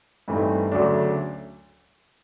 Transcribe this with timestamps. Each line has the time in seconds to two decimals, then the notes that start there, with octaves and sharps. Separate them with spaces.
0.28 G2 E3 A3 C4 D#4
0.72 D2 C#3 F#3 A3 D4